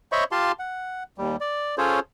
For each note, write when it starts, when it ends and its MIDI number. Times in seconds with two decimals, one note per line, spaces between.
0.12 0.24 72
0.12 0.24 73
0.12 0.24 75
0.12 0.24 76
0.12 0.24 83
0.12 0.24 85
0.32 0.52 65
0.32 0.52 67
0.32 0.52 77
0.32 0.52 81
0.32 0.52 84
0.59 1.03 78
1.18 1.36 39
1.18 1.36 55
1.41 1.75 74
1.78 2.00 61
1.78 2.00 65
1.78 2.00 68
1.78 2.00 69
1.78 2.00 72
1.78 2.00 73